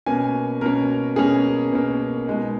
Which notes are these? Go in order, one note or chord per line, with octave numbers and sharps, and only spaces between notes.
B2 A#3 C#4 G#5
B2 A#3 C#4 A#4
B2 A#3 C#4 G#4
B2 A#3 C#4
B2 G#3 D#4